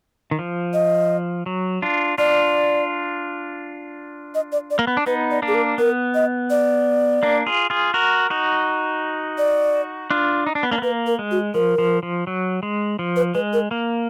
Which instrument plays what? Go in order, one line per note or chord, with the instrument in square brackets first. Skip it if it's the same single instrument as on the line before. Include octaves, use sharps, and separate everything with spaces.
[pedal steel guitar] D#3
F3
[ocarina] D#5
[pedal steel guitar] F#3
D4 F4
[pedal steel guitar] D4 F4 [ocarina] D5
[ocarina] D#5
D5
D5
[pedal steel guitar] A#3
B3
D4
[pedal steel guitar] B3 D#4 [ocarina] B4
[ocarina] D5
[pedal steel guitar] A#3 D4
[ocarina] G#4
A#4
[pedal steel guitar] B3 [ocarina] A#4
[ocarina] D#5
D5
[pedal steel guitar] A#3 D4
F4 G#4
F4 G#4
F#4 A#4
D#4 F#4
[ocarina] D5
[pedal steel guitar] D4 F4
D#4
D4
B3
A#3 D4
B3
[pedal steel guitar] A#3 [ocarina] B4
[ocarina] A#4
[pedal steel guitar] G#3
[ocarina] F#4
[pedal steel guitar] F3 [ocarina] A#4
[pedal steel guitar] F3
F3
F#3
G#3
F3
[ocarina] B4
[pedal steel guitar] G#3 [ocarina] B4
[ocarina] A#4
[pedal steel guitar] A#3